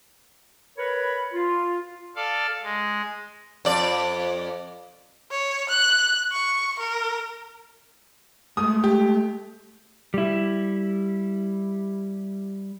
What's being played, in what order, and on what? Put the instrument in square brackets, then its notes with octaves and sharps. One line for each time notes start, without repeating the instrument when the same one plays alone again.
[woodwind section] A#4 B4 C#5 B5
F4
[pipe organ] A4 D5 F5
G#3
[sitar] F2 D5
[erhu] C#5
F#6
C#6
A#4
[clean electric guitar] G#3 A3 [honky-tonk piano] D#6
[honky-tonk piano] G4
[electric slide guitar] G3 E4